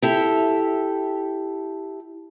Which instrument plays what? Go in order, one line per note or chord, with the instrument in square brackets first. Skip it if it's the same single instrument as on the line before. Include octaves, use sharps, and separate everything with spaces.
[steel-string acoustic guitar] E4 G4 A4